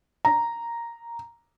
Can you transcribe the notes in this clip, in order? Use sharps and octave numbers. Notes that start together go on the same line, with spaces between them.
A#5